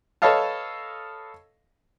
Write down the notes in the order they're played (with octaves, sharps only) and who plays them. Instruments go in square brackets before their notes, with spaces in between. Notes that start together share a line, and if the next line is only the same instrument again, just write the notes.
[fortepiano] A4 B4 C#5 D#5 F5 A5